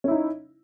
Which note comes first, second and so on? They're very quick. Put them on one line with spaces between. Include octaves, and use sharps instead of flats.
C#4 E4 D#4